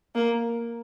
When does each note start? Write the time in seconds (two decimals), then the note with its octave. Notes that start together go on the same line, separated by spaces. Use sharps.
0.15 A#3